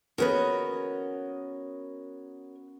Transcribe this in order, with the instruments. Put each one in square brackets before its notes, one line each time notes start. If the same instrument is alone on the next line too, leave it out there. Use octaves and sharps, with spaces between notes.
[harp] B3 C#4 F#4 [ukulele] G#4 B4 [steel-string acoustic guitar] A#4 C#5 D#5